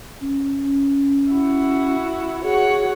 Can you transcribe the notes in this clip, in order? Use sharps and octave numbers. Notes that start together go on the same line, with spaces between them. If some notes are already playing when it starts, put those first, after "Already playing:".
C#4
E4 F#4
F#4 G#4 C#5 F#5